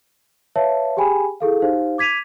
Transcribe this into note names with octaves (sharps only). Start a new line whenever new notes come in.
B4 C#5 E5 F5 A5
G4 G#4 G5 G#5 B5
E4 G#4 A4 F5
D#4 G4 C5 F5
D6 G#6 B6 D#7 F7